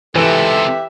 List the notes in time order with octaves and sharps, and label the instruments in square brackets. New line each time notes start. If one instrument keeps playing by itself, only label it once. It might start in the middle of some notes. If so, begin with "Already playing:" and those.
[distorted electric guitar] C#2 C3 [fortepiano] E3 [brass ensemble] G4 E5 [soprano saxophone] A4